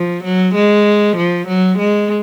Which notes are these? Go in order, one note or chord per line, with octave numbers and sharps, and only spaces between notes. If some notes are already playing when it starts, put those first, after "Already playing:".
Already playing: F3
F#3
G#3
F3
F#3
G#3